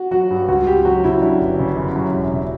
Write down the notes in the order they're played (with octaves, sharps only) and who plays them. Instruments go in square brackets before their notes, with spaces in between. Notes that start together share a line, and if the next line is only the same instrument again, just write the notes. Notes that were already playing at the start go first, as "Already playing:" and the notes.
Already playing: [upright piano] F#4
[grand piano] F#3 [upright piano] F#4
[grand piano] G2
[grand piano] C#2 [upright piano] F#4
[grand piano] C#2 [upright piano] G4
[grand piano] F#3 [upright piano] F#4
[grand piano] C#3 [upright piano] E4
[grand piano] F#3 [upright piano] D4
[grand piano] G1
C#3
F#2
F#3
E1
C#3